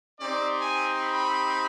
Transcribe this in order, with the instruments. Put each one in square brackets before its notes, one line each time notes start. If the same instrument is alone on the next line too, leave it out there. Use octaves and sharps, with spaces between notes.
[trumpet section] C4 D#4 G4 D5
G#5
B5